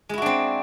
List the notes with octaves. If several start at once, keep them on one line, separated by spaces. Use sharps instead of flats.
G#3 C4 D4 E4 F#4